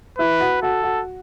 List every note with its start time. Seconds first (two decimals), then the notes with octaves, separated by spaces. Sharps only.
0.18 E4 B4
0.40 F#4
0.62 F#4 A4
0.83 F#4